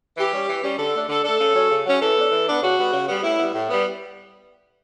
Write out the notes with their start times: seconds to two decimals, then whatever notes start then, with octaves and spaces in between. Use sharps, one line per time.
0.17 E3 G4
0.33 G3 C#4
0.48 E3
0.64 G3 C#4
0.78 D3 A4
0.94 A3 D4
1.09 D3 A4
1.24 A3 D4 A4
1.40 C#3
1.55 F#3 C#4
1.70 C#3
1.85 F#3 C#4
2.00 E3 A4
2.17 B3 D4
2.31 E3
2.47 B3 D4
2.62 C#3 F#4
2.78 G3 B3
2.93 C#3
3.07 G3 B3
3.24 A2 E4
3.39 G3 B3
3.54 A2
3.70 G3 B3